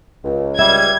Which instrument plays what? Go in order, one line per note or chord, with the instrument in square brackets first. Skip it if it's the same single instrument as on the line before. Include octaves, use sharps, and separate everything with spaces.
[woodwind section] C#2
[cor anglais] G3 [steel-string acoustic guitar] E5 [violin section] G#6